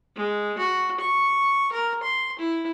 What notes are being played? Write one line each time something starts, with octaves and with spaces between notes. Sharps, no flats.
G#3
F#4
C#6
A#4
C6
E4